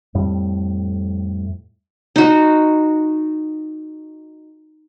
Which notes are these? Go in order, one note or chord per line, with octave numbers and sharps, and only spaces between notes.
F2 A2 G3
D#4 F#4